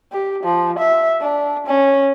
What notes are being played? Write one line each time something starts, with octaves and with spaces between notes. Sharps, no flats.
G4
F3
E5
D4
C#4